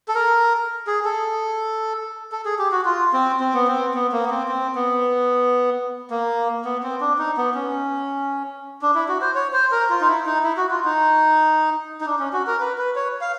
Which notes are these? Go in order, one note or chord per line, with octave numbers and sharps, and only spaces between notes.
A4
A#4
G#4
A4
A4
G#4
G4
F#4
F4
C4
C4
B3
C4
B3
A#3
B3
C4
C4
B3
A#3
B3
C4
D4
D#4
B3
C#4
D4
E4
F#4
C5
C#5
C5
A#4
F4
D#4
E4
D#4
E4
F#4
F4
D#4
D#4
D4
C#4
F#4
A#4
B4
B4
C#5
F5